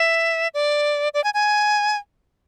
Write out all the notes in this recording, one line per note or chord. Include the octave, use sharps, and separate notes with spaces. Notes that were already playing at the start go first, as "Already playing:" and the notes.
Already playing: E5
D5
D5
G#5
G#5